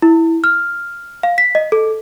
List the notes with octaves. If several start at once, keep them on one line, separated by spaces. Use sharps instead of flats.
E4
F6
F5
B6
D#5
A4